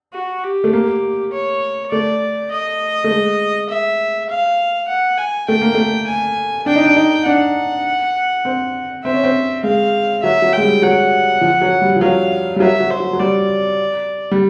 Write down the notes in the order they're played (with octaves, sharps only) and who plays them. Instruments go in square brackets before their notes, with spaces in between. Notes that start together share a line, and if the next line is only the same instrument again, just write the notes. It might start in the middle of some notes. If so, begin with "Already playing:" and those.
[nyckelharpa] F#4
G4
[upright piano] A3
A#3
[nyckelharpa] C#5
[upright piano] A3 [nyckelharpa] D5
[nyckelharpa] D#5
[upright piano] A3
G#3
[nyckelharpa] E5
F5
F#5
G#5
[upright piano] A3 [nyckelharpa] G5
[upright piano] A#3
A3
[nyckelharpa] G#5
[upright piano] D4 [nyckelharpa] G5
[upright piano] D#4
D4
D#4
[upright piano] D4 [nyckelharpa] F#5
[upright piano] C4
[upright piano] C4 [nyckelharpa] E5
[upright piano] C#4
C4
[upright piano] G#3 [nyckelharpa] F5
[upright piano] F#3 [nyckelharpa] E5
[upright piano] F#3
[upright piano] G#3 [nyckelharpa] G5
[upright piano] G3
[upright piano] F#3 [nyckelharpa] F#5
[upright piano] F3
F#3
G3
F3
[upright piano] F#3 [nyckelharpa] F5
[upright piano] G3
[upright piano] F#3 [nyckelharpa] E5
[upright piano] F#3
[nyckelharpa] C5
[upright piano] F#3
F#3
[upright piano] G3 [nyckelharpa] D5
[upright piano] G3